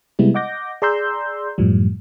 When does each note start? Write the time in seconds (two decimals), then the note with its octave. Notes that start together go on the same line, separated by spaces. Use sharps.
0.19 C3 G3 G#3 B3 E4
0.34 D#5 F#5 D6 G6 A#6
0.82 G#4 D5 A#5 C6 E6 G6
1.58 F#2 A2 F3 G3